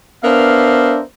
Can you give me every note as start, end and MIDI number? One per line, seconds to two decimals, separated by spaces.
0.24 1.02 59
0.24 1.02 62
0.24 1.02 70
0.24 1.02 72
0.24 1.02 76
0.24 1.02 77